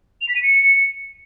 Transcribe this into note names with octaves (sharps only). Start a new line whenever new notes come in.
F7
B6
D#7
C#7